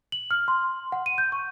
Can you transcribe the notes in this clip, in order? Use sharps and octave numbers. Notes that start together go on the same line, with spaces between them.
F#7
F6
C6
F#5
D#7
G6
C#6